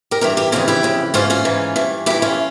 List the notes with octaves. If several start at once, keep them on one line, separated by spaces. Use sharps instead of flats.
G4 A#4
G2 E3 G4 A#4
G4 A#4
F2 C#3 E3 F4 G#4
E4 G4
F2 C#3 E3
G#2 E3 C#4 F4
C#4 F4
G#2 E3
G2 E3
G2 E3 E4 G4
C#4 F4